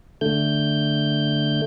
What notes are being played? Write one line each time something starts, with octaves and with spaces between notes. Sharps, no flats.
D3 A3 G6